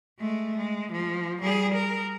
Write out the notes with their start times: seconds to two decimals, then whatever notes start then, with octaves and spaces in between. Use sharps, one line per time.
0.19 G#3 A3
0.57 G#3
0.92 F3
1.41 G3 G#4
1.74 A#4